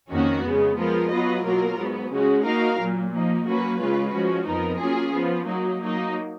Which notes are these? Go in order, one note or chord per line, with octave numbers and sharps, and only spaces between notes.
F2 D#3 A#3 C#4 F#4
C#3 G#3 B3
F3 G#3 B3 F4 A#4
F#3 B3 F4 B4 D#5
B2 F#3 A#3 F4 A#4
G#2 F#3 B3
C#3 G#3 C#4 F#4
A#3 D#4 F#4 A#4 F5
A#2 F#3 A#3
F3 A#3 D#4
F#3 A#3 C#4 F#4 B4
C#3 G#3 C#4 F4 B4
F3 G#3 C#4 F#4
F2 F3 B3 D#4 A#4
F#3 A#3 C#4 F4 G#4
F3 B3 F4
F#3 A#3 D#4
F#3 A#3 D#4